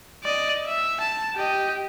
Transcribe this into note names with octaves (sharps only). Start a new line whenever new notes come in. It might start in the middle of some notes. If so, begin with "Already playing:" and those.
D5 D#5
E5
A5
G4 D#5